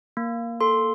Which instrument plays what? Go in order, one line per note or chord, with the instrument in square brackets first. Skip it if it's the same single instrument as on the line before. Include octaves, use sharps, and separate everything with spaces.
[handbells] A#3
A4 C6